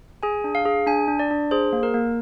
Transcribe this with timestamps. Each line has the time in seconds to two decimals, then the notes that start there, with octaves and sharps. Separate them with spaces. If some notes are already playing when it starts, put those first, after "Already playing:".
0.23 G#4 G#5
0.44 D4
0.55 F5
0.65 G#4
0.86 D4 G#5
1.08 D4
1.19 D5
1.31 D4
1.51 G#4 C5
1.73 A#3
1.83 A#4
1.94 A#3